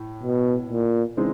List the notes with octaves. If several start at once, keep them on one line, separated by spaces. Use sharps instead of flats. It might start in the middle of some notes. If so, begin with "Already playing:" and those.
Already playing: A2
B2
A#2
C#3 E3 G#3 C4 D#4